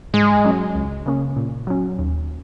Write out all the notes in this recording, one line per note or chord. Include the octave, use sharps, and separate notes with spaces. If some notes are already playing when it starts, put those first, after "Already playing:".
G#2 G#3
F#3 C#4
C#2
C#3 A#3 C#4
A#2
F#3 C#4
D#2